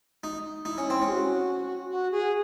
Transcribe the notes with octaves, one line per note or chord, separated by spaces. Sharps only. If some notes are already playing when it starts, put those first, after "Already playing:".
D#4
D#4 E4
C#4
C4
C#4 G#4
F#4
F#4
G#4